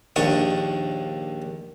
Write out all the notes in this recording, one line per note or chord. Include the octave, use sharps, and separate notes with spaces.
A#1 D#2 D4 C#6 D#6